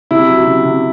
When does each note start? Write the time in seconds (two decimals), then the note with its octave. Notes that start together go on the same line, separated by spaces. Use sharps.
0.11 C3 E4
0.29 F#3
0.47 C3
0.65 C3